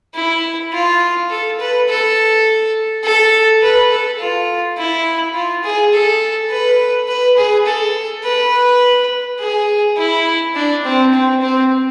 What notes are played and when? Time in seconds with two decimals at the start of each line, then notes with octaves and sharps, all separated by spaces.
0.15 E4
0.73 F4
1.30 A4
1.60 B4
1.88 A4
3.04 A4
3.62 B4
3.91 A4
4.19 F4
4.78 E4
5.34 F4
5.64 G#4
5.93 A4
6.50 B4
7.08 B4
7.37 G#4
7.66 A4
8.24 B4
9.40 G#4
9.97 E4
10.55 D4
10.85 C4
11.13 C4
11.42 C4